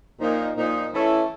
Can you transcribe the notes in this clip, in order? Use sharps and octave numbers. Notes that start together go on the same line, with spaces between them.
A#2 F3 A#3 D#4
A#2 F3 A#3 D#4
E3 A3 C#4 E4 A4